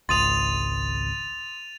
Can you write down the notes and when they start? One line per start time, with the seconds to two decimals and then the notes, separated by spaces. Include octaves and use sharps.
0.09 G#1 C#2 C6 D#6 A6 D#7 F7